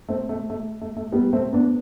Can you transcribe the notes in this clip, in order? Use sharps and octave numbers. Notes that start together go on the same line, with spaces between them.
A3 C4
A3
A3
A3
A3
G3 B3
A3 C4
B3 D4